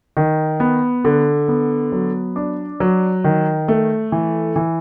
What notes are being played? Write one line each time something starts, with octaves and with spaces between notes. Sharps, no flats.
D#3
B3
D3
B3
F#3
D4
F#3
D#3
A3
E3
E3